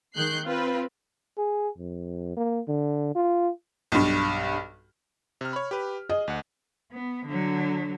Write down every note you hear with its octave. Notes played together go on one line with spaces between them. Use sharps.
D#3 G#3 F#6 G6 C7
C4 F4 B4
G#4
F2
A#3
D3
F4
B1 G2
C3 F6
C#5 B5
G4 B4
G#4 D#5
D2 F#5
B3
D3 F#3